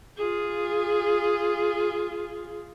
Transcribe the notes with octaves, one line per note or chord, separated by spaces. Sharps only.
F4 G#4